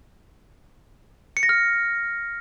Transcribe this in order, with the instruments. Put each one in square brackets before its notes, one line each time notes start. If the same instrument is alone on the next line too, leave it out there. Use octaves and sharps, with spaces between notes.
[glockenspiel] C#7
A#6
F6